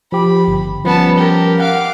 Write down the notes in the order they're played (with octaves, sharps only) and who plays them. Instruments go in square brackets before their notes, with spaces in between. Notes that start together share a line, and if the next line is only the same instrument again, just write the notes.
[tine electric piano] F3 G4 [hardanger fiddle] B5
[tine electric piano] G1
[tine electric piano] F3 G3 C#4 [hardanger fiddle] B3 A5
[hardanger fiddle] G4 A#4
[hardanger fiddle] F5 D6 [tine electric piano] F#5